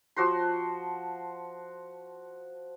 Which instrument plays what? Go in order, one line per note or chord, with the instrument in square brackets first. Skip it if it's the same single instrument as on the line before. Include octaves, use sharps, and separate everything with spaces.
[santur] F3 F#4 C6